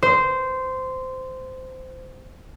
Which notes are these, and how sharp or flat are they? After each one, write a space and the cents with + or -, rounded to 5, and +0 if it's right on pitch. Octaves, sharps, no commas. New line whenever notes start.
C5 -15